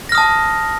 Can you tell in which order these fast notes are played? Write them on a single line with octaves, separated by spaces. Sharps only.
A#6 F6 D#6 A5